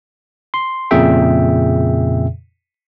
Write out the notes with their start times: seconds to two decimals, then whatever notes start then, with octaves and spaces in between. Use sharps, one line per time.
0.54 C6
0.91 F2 A#2 C#3 G#4 E5 G5